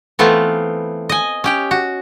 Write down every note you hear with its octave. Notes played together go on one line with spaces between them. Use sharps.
E3 A3 B3 C4 F4
D#5 G#5
C#4 G4 G5
F#4